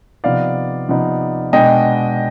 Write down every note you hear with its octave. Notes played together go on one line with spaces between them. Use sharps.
C3 F3 B3 D#4 D5 F5
C3 F3 B3 D#4
B2 G#3 B3 D4 D#5 G5